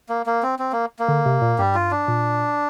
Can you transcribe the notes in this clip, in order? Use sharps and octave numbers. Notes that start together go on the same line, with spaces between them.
A#3
A#3
C4
C4
A#3
A#3
D3
C3
A#2
G2 G3 G4
F4
D4
A#2